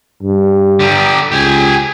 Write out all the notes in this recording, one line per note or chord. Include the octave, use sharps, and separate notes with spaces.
G2
D3 G4
C#2 G4 G#5